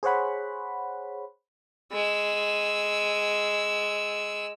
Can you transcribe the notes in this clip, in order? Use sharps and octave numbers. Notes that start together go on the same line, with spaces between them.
G#4 C5 C#5 F#5 B5
G#3 E6